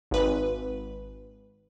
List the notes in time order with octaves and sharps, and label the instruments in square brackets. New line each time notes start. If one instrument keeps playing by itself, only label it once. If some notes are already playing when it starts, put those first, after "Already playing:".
[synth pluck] G#1 B4